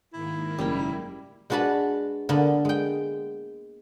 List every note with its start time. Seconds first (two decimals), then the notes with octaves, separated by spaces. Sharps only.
0.13 G#2 D#3 A#3 E4
0.58 F#1 G3 A#4 G5
1.50 G#3 D4 F#4 B4 A5 B5
2.29 D3 A#3 B3
2.65 G#3 G5